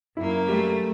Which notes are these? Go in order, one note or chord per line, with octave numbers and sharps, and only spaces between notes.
F#2 A#3 E4
G3 A3